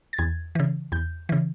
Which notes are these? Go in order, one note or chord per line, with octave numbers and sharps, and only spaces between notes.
A6
E2 G#6
C#3 E3
E2 G6
C#3 E3